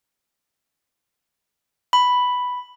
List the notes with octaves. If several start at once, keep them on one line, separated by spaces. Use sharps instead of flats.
B5